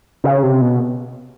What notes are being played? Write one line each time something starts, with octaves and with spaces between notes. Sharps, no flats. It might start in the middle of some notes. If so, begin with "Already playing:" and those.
C#3
C3
B2